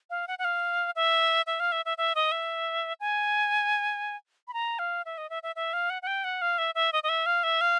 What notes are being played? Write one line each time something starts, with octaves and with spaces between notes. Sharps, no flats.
F5
F#5
F#5
F5
E5
E5
F5
E5
E5
E5
D#5
E5
G#5
B5
A#5
F5
E5
D#5
E5
E5
E5
F5
F#5
F#5
G5
F#5
F5
E5
E5
D#5
D#5
E5
F5
E5
F5